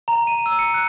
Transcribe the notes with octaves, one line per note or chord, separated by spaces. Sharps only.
A#5
D#7
E6
C#7
F#6